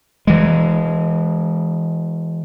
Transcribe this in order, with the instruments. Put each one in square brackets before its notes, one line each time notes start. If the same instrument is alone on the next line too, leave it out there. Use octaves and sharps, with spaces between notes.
[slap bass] E3 G#3